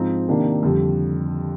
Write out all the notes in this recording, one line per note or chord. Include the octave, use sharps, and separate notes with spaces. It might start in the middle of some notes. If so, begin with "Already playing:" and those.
Already playing: G#2 F3 C4 D#4
C3 D#3 A#3 D4
F2 D3 G3